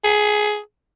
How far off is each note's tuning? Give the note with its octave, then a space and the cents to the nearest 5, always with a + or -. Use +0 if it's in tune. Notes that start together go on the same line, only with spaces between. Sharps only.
G#4 +15